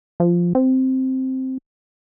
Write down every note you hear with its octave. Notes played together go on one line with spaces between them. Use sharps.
F3
C4